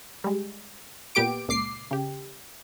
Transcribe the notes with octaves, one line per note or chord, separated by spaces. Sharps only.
G3 G#3
A#2 B3 G4 D6 D7
C#2 A#2 D6 C7
C#3 G4